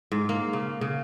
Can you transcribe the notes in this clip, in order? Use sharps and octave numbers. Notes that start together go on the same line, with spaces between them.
G#2
A#3
C#3
C#3